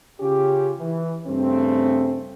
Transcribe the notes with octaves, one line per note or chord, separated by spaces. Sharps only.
C#3 C#4 F4 G4
E3
G2 C#3 A3 C4